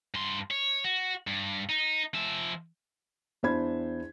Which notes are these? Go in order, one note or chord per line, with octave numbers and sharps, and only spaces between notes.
G2 C6
C#5
F#4
G2
D#4
F3 E5
E2 D4 E4 C5 B5 G#6